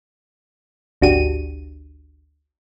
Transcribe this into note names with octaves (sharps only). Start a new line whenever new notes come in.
G#1 D2 D4 F#4 G4 D#7